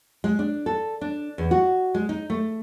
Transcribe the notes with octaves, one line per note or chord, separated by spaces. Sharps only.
G#3
D4
A4
D4
E2
F#4
G#3
D#4
A3